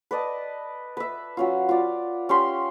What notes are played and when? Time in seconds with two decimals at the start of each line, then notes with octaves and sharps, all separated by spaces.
0.11 B4 D5 D#5 A5
0.97 B4 E5
1.37 F#3 C#4 F4
1.69 F4 D5
2.29 C#4 G4 B5 C6